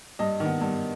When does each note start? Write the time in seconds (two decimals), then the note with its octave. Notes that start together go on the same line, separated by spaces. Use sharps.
0.19 G2 D#5
0.40 D#3 B3
0.61 G2